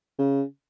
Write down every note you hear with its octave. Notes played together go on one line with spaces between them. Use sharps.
C#3